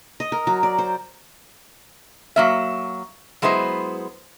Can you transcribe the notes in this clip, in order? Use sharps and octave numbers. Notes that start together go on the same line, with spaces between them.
D#5
A#4
F#3
D5
C5
F#3 A#3 E5
F#3 G#3 B3 E4 C5